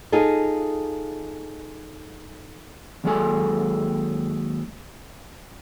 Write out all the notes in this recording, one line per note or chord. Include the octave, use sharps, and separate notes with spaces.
D#4 F4 G#4 A4
D#2 F#3 G#3 G#4 A4 G#5